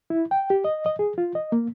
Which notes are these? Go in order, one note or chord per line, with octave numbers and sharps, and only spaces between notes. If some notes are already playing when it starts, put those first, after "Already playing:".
E4
G5
G4
D#5
D#5
G#4
F4
D#5
A#3